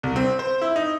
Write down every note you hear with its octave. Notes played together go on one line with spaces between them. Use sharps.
C2
C4
C5
E4
D#4